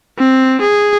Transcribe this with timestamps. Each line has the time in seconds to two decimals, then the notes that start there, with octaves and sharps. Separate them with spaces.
0.19 C4
0.61 G#4